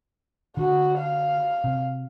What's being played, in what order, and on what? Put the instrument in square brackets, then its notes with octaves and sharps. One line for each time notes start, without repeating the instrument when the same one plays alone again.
[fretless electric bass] D3 [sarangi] F#4
[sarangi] F5
[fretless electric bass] C3